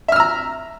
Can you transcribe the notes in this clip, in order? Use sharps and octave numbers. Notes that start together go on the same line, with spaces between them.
E5 A#5 E6 F6